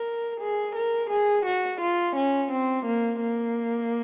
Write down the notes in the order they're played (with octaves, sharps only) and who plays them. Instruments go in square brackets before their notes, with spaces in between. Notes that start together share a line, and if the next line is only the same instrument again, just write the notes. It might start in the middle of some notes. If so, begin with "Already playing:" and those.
Already playing: [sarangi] A#4
G#4
A#4
G#4
F#4
F4
C#4
C4
A#3
A#3